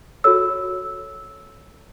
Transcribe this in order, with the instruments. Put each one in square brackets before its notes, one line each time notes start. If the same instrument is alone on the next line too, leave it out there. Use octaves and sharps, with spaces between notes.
[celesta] F#4 A4 C#5 E6